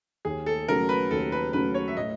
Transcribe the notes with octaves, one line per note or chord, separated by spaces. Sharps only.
D#2 G#4
A4
C#3 F#3 A3 C#4 A#4
B4
D#2 A4
B4
C#3 F#3 A3 C#4 B4
C#5
E5
A2 D#5